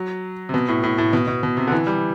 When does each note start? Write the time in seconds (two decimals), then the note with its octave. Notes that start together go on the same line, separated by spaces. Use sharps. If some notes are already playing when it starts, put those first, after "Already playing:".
Already playing: F#3
0.49 C3
0.54 B2
0.68 A2
0.83 A2
0.98 A2
1.13 B2
1.27 B2
1.43 B2
1.57 C3
1.67 D3
1.72 E3
1.87 G3